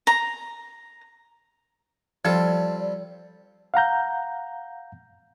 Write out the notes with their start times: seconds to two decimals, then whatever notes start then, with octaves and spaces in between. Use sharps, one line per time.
0.07 A#5
2.25 F3 G3 C4 F4 A4 D5
3.74 F5 F#5 A#5 G6